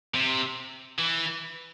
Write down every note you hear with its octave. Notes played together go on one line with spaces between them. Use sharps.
C3
E3